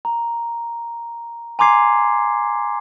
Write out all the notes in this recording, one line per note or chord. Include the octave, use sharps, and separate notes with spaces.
A#5
G#5 A#5 C6 D6 G#6 C7